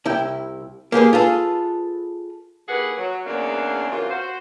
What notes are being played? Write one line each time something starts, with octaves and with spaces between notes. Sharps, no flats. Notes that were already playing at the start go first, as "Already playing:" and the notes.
C2 E4 G5
A#3 G4 G#4 B4
F4 G#4 A4 B4
D#2 E4 G4 G#4 B4 F#5
F#3
E2 C#3 F#3 A#3 D4
F#2 C3 E3 F4
F#4 C5